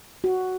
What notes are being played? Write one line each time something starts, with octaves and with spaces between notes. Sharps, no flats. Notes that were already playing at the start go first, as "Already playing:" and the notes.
F#4